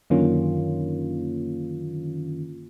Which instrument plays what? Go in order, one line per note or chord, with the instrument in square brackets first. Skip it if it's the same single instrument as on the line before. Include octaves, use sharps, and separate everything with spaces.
[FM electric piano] F#2 D3 D#3 A#3 C#4 F4